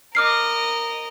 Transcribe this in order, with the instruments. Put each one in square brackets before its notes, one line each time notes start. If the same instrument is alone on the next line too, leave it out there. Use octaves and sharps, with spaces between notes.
[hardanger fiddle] A#4 D#5 [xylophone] D6 F6 C7